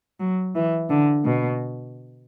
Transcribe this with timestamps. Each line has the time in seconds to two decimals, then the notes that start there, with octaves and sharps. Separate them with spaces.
0.20 F#3
0.55 E3
0.90 D3
1.25 B2